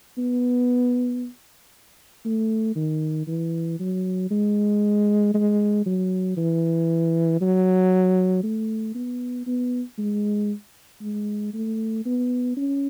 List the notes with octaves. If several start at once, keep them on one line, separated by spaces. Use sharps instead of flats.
B3
A3
D#3
E3
F#3
G#3
G#3
F#3
E3
F#3
A3
B3
B3
G#3
G#3
A3
B3
C#4